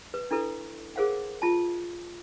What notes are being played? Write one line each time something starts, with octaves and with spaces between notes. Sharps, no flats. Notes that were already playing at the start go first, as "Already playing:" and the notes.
B4
D4 E4 A4 B4
G#4 A#4 C5 F5 F#5
F4 A5